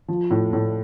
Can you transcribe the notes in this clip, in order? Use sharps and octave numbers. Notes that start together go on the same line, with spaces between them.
F3
A2
A2